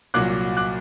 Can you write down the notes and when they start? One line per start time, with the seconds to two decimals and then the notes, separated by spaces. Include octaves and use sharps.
0.14 C2 A#2 F#3 D6 F#6
0.57 D6 F#6